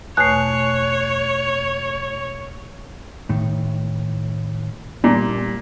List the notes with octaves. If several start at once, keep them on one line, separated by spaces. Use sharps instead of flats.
E2 B2 A3 C#5 F#6 C7
A2 D#3
A#2 G3